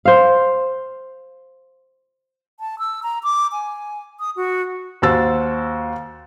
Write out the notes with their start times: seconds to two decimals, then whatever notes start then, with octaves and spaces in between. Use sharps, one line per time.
0.05 C5 F5
2.60 A5
2.79 E6
3.03 A#5
3.23 D6
3.52 G#5
4.20 D#6
4.36 F#4
5.02 D#2 F#4 C5 E6 A6